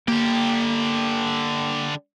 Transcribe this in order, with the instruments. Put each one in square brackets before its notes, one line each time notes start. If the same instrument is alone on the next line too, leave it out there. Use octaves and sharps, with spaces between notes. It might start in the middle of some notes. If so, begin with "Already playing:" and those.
[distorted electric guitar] D3 G4 [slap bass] A#3